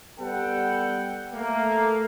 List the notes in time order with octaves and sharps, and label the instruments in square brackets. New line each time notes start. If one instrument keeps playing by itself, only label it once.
[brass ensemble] G3 B3 G4 A4 F#5 G5
A3 A#3